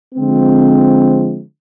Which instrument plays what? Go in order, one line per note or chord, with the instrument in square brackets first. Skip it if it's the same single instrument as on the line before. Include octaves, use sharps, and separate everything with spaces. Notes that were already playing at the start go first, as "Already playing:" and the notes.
[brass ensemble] D3 F3 G#3 C4